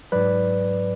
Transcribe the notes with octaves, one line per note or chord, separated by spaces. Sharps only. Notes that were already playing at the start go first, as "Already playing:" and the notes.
G#2 F#3 B4 D5